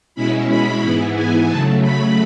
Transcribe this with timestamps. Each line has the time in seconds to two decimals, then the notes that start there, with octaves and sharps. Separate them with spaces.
0.15 B2 G#3 C#4 E4 B5
0.48 B5
0.82 G#2 E3 G#3 B3 E4 B5
1.15 G#5
1.48 C#3 F#3 A3 A5
1.82 B5